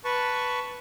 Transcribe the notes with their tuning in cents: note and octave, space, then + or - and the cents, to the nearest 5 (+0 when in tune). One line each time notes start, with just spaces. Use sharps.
B4 +0 A5 +0 C#6 +0